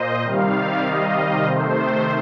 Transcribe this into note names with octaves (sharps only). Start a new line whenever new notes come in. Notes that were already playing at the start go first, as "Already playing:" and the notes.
Already playing: A#2 C5 D#5
C3 D#3 G3 F5
D#5
D#5
C3 D#3 A3 C5